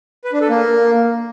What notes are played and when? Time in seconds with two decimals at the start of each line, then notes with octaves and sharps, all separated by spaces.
0.25 B4
0.33 D4
0.41 A4
0.49 A#3